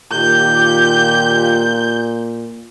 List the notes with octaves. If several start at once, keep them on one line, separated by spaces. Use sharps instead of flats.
A#2 D#3 F4 G4 G6